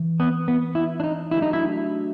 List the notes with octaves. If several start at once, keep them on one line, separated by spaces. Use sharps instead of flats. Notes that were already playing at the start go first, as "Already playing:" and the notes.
Already playing: E3
B3
B3
E4
D4
D#4
F#3 A3 D4 E4 G4
D#4
E4